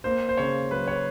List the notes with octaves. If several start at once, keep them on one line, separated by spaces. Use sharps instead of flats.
A#3 C5
C5
C#3 C#5
F#3 B4
C#5